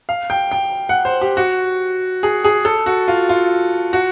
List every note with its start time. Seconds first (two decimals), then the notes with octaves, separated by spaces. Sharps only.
0.09 F5
0.30 G5
0.52 G5
0.89 F#5
1.05 C5
1.21 G4
1.37 F#4
2.23 G#4
2.44 G#4
2.65 A4
2.86 F#4
3.08 F4
3.29 F4
3.93 F#4